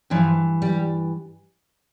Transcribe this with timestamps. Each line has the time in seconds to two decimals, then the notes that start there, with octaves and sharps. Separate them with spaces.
0.10 G2 E3 F3
0.62 G3